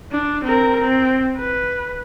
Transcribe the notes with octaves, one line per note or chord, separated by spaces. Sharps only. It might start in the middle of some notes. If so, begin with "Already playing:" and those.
D4
C4 A#4
C4
B4